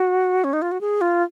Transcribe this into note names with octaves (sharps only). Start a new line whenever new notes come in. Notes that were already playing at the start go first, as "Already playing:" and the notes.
Already playing: F#4
C#4
D#4
F4
F#4
G#4
F4